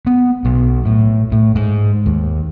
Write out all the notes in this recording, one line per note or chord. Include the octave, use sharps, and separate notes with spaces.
B3
B1
A2
A2
G#2
D#2